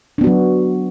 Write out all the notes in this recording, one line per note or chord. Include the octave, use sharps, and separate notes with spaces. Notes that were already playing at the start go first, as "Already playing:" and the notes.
F#3 B3 D4 F#4